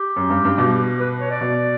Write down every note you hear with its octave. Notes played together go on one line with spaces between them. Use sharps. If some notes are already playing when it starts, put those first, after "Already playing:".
Already playing: G4
F#2
G2
G2
B2
B4
C#5
D5
B2